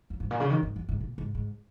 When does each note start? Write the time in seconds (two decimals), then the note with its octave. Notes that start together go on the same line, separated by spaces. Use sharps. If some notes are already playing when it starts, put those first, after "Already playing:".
0.10 F2
0.20 G#2
0.31 A#2
0.40 C#3
0.50 D#3
0.63 G#2
0.76 F2
0.89 G#2
1.01 A#2
1.18 G#2
1.35 G#2